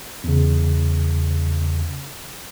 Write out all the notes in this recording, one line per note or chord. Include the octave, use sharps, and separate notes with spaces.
E2 C#3